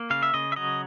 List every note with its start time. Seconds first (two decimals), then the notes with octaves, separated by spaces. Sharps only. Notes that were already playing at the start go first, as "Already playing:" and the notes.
Already playing: A#3
0.10 C#3 F5
0.23 E5
0.34 C#3 D#5
0.52 E5
0.56 F#3 D#5